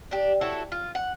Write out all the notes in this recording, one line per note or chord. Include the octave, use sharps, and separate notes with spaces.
D4 G4
E4 F#4 A4 C#5
F4
F#5